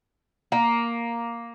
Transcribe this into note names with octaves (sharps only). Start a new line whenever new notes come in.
A#3